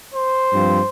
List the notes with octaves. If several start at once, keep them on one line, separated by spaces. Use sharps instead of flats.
C5
G2 F3 C4